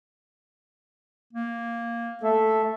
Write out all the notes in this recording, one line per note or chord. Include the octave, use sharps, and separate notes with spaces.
A#3
A3 A4 E5